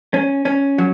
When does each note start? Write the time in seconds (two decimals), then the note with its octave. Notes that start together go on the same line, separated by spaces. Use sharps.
0.14 C#4
0.45 C#4
0.78 F#3